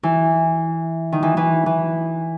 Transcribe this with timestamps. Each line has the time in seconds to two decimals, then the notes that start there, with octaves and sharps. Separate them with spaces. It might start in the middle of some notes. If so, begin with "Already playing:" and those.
0.03 E3
1.12 D#3
1.23 E3
1.37 E3
1.66 E3